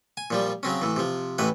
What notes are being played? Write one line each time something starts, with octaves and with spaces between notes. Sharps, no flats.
G#5
A#2 F3 G3
C#3 F#3 C4 C#4
A2 E3
C3 F3
A1 A2 E3 B4